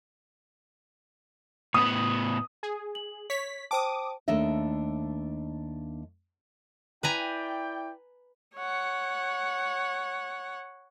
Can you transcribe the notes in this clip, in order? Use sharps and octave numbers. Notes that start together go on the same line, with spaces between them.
A2 B3 B4 D#6
G#4
F#7
C#5 B6
C5 G5 A5 D6 D#6
D#2 A3 D4 D#5 E5
E4 B4 D5 G5 G#5 A#5
C#5 F#5